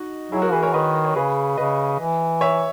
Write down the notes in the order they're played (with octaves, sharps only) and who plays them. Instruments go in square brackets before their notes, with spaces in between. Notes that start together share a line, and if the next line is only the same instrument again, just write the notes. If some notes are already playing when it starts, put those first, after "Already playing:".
Already playing: [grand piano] D#4 F#4
[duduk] F#3 [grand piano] E4 G#4
[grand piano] F#4 A#4
[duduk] E3 [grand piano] G#4 B4
[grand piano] A#4 C#5
[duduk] D#3 [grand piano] B4 D#5
[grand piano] C#5
[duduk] C#3 [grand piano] G#4 B4
[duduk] C#3 [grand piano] B4 D#5
[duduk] E3
[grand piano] C#5 E5